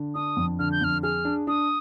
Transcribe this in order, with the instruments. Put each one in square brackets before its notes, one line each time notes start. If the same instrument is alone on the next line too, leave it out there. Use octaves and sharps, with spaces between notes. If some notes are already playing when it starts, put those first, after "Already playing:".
Already playing: [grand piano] D3
[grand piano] D4 [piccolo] D#6
[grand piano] F2
[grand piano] D3 [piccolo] F6
[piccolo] G6
[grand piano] F2 [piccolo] F6
[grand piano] G#4 [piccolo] F6
[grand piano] D4
[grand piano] D4 [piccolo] D#6